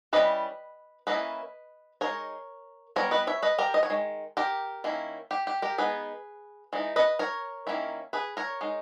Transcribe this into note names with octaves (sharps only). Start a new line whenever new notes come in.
E3 G3 C#4 B4 D#5
E3 A#3 C#4 E4 B4 D#5
G#3 D#4 A#4 C#5
E3 G3 B3 A#4 C#5
B4 D#5
C#5 E5
B4 D#5
G4 A#4
D#5
C#5
D#3 G#3
G4 A#4
D#3 A#3 C#4 E4
G4
G4
G4 A#4
G#3 B3 D#4 G#4 B4
E3 G#3 D#4
B4 D#5
A#4 C#5
D#3 A#3 C#4 E4
G#4 B4
A#4 C#5
G#3 D#4